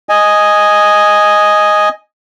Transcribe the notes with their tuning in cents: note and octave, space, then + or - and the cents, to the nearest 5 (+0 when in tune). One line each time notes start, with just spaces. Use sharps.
D#5 +0 G#5 +0